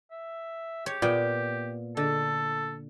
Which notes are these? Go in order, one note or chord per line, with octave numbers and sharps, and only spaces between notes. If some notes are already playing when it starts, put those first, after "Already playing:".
E5
G4 C#5
A#2 B3 G5
D3 A4